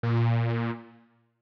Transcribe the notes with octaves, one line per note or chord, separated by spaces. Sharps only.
A#2